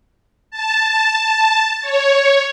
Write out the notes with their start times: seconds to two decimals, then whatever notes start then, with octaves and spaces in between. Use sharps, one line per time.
0.51 A5
1.82 C#5